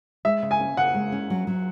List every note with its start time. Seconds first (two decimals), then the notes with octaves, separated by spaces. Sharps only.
0.25 G#3 E5
0.42 C#3
0.51 G#5
0.60 C#4
0.77 C#3 F#5
0.94 G#3
1.12 C#4
1.30 F#3
1.47 F#3